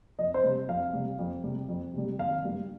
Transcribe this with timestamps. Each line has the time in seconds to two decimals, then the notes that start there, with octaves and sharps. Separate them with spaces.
0.19 F2 D#5
0.34 C5
0.43 C3 G3
0.68 F2 F5
0.93 C3 G3
1.19 F2
1.44 C3 G3
1.69 F2
1.94 C3 G3
2.19 G#1 F5
2.45 G2 G3